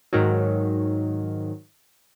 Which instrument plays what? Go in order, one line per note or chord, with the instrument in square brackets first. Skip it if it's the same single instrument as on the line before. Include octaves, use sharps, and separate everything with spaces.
[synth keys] G#2 D#3 F#3